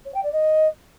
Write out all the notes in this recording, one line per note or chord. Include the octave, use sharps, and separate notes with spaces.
C#5
G5
D5
D#5